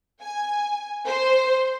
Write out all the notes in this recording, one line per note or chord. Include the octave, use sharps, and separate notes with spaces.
G#5
C5